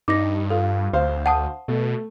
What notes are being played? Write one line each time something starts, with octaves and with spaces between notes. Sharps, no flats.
G2 D#4 D6 A#6
F4 A4
D2 C5 F5
F#5 A5 D#6
B2 A3